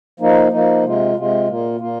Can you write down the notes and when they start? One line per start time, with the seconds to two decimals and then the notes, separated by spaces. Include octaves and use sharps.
0.20 F3 A#3 D#4
0.52 F3 A#3 D#4
0.84 C3 G#3 F4
1.16 C3 G#3 F4
1.48 A#2 A#3 F4
1.80 A#2 A#3 F4